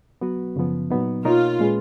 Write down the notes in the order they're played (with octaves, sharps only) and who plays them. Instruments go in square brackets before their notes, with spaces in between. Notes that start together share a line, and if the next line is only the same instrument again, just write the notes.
[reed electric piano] F#3 B3 F#4 B4
F#2 C#3 F3 B3
A#2 F#3 B3 D#4
[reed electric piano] B2 A#3 D#4 A#4 C#5 [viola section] F4
[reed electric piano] A#2 G#3 C#4 G#4 B4